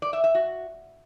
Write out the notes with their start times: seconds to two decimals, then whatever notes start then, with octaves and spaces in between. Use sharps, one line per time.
0.02 D5
0.13 E5
0.24 E5
0.35 F#4